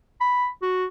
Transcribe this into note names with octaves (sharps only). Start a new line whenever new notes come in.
B5
F#4